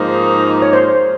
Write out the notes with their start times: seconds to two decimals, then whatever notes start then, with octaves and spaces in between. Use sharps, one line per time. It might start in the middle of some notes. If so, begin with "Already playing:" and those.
Already playing: G#2 F3 A#3 D#4
0.62 C#5
0.73 C5